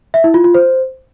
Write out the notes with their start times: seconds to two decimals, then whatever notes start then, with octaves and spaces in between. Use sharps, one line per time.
0.14 E5
0.24 E4
0.34 F4
0.44 F4
0.55 C5